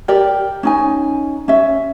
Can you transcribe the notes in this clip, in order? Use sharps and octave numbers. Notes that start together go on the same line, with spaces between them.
G4 A#4 D5
C#4 D#4 G#5
C#4 E5